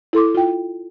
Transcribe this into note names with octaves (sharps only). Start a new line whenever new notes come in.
E4 A4 C6 D6
F4 G5